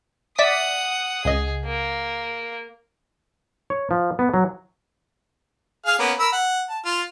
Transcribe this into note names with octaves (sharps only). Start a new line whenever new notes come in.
D5 E5 F#5 D#6 B6
C#2 G#4 D#5
A#3
C#5
F3
B3
F#3
G#4 F5 F6
A#3 B3 C#4
A#4 B5 E6
F#5
A5
F4